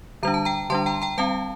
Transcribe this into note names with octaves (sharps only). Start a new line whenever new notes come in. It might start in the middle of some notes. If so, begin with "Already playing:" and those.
D3 G3 D4 A#5
A5
G5 A#5
D3 G3 D4 A5 C6
G5 A#5
G5 A#5
G3 C4 F5 A5